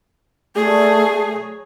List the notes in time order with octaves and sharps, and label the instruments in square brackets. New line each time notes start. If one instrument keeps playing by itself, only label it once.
[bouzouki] G3 D5 [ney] A3 [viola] G#4
[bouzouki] F#3 C#5